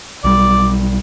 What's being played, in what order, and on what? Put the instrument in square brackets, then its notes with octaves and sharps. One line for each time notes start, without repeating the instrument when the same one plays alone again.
[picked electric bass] B1 G3 [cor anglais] D5